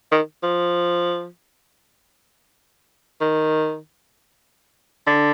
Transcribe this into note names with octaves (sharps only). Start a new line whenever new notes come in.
D#3
F3
D#3
D3